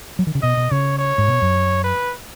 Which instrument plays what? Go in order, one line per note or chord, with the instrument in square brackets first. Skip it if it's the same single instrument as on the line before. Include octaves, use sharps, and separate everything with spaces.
[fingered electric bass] F#3
D#3
C#3
[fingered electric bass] B2 [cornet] D#5
[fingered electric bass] B2
[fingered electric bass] C#3 [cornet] C#5
[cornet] C#5
[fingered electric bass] G#2
B2
F#2
[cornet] B4